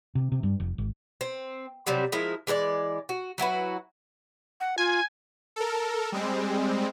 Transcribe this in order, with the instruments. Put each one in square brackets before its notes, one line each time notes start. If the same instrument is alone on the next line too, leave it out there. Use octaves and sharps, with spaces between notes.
[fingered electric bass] C3
C3
G2
F1
G#1
[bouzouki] C4
C3 F#3 G3 C4
F3 G#3 E4 A#4
E3 G#3 B4 D5
F#4
F#3 E4 F#4 B4
[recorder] F#5
[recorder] F4 [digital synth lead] G#5
[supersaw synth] A4 A#4
G3 G#3 C4